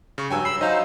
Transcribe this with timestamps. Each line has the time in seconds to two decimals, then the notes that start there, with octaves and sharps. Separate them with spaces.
0.18 C#3 C#6
0.30 G2 F#3 G5 G#5 E6
0.45 B5 E6 C7
0.61 F#3 D#4 C5 D#5 F5 E6